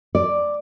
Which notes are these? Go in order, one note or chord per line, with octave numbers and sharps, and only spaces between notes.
D5